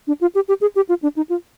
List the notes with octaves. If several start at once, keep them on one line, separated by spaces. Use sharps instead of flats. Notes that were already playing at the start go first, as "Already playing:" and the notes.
D4
F4
G4
G4
G#4
G4
F4
D4
D#4
F4